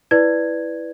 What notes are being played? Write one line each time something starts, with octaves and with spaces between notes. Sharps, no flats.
E4 B4 D5 G#6